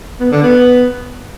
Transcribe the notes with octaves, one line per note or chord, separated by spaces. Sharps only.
B3
D3
B3